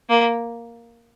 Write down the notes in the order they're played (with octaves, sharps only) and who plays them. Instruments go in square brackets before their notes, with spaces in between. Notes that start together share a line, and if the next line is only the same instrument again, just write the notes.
[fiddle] A#3